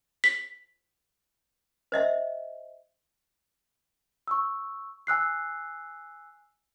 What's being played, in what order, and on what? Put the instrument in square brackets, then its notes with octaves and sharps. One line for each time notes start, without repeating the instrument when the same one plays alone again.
[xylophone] B6
[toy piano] C5 D#5 E5
[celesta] C#6 E6
G#5 E6 F#6 C7